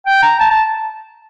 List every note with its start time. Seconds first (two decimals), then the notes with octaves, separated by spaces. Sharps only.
0.06 G5
0.22 A#5
0.40 A5
0.50 A5